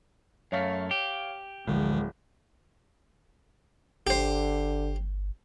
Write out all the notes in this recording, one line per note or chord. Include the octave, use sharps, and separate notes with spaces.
F#2 A3 C#5 F5
G4
D1 A1 D3 F3 G#3
G1 D3 G4 C5